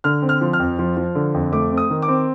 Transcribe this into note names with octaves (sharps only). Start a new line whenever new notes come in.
D3 F6
C4
F6
F3
F6
F2
F3
F3
D3
F2
A3 D6
C4
D#6
D#3
D6
C4